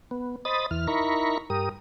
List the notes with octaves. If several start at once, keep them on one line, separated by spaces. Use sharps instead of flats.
B3
C5 D#5 B5 D#6 A6
E2 E3 F6
D#4 E4 A#4 A#5 B5 C#6
G2 G4 A#4 D#6